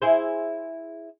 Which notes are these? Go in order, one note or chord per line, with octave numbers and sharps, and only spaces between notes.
E4 G#4 C5